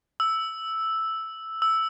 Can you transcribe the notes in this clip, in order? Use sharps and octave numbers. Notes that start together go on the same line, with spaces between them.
E6
E6